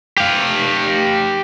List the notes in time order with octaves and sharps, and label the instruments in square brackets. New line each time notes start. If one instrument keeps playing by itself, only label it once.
[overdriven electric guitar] G4 F5